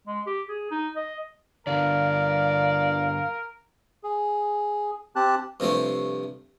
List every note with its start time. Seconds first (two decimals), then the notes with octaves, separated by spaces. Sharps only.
0.07 G#3
0.26 G4
0.49 G#4
0.71 D#4
0.96 D#5
1.67 G2 D3 A#4 D5 F5
4.04 G#4
5.16 C4 G4 A5 F#6
5.60 G2 C3 F3 A3